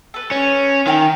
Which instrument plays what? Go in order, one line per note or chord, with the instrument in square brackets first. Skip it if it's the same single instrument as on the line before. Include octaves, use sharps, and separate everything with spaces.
[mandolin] A4 B4
[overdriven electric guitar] C#4
[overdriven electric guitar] D#3 [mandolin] E5 G5 A#5